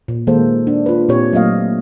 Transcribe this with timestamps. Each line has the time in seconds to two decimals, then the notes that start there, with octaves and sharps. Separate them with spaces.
0.08 A#2
0.27 D#3 G#3 A#3 A4 C5
0.67 D4
0.86 F4 B4
1.09 A#2 C4 G4 C#5
1.32 F#3 A3 A#3 D#5 F5